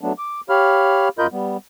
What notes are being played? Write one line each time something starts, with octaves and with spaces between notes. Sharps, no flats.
F#3 A3 B3 D4
D6
G4 C#5 F5 B5 F6
F#2 F4 A#4 D#5 B5 G6
G3 B3